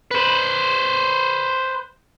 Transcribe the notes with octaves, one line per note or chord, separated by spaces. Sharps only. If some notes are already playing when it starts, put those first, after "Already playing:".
B4 C5